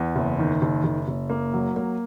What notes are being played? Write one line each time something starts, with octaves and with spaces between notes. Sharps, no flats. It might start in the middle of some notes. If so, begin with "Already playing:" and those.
Already playing: E2
F#1
D#3
F#1
F#1
F#1
A#3
F#3
A#3